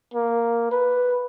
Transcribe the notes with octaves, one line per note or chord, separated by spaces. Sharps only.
A#3
B4